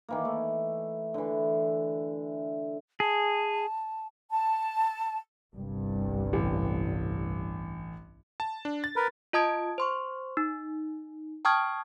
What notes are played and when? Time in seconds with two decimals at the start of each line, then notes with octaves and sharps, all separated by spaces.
0.09 D#3 E3 A#3
0.25 A3
1.14 D3 E3
3.00 G#4 A5
4.31 A5
5.54 G1 C2 G2
6.33 A1
8.40 A5
8.65 D4
8.84 A6
8.96 A#4 B4
9.33 F4 D#5 A5 D#6 G#6 D7
9.78 C5 C6 C#6
10.37 D#4
11.45 G5 A5 C#6 D#6 F6 G#6